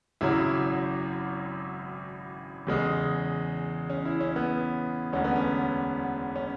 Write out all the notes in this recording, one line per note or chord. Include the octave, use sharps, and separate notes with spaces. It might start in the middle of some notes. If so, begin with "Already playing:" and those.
G#1 F#2 C#3 F#3 E4
E2 C#3 G#3
C#4
E4
C#4
B3
E1 D2 D3 C#4
B3
C#4
C#4